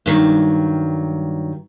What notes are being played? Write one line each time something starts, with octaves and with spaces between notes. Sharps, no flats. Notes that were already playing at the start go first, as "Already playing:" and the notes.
G2 D#3 F#3